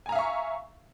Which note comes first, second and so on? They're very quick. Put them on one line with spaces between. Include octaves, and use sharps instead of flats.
G#5 A#5 F5 E5 C#6